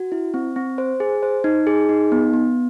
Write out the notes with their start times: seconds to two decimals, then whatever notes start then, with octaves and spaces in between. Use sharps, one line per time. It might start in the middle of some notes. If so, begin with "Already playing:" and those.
Already playing: F#4
0.12 E4
0.34 C4
0.56 C4
0.78 C5
1.00 G#4
1.23 C5
1.44 D#4
1.67 G#4
1.89 D#4
2.12 B3
2.33 B3